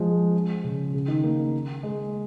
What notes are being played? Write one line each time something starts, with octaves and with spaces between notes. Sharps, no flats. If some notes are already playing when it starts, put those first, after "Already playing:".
Already playing: F3 G#3
C#3
C#3
D#3
A#3
G#3